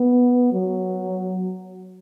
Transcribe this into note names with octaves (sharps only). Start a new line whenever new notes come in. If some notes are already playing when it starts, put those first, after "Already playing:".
Already playing: B3
F#3